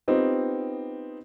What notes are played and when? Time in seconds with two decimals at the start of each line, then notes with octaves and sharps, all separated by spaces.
0.08 B3 C4 D#4 F4 G4